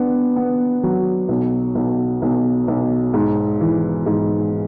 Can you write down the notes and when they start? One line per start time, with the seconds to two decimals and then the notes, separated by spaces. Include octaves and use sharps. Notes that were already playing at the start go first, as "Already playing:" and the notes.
Already playing: B3 D4
0.36 B3
0.83 F#3
1.29 B1
1.75 B1
2.22 B1
2.68 B1
3.14 G#2
3.61 E3
4.06 G#2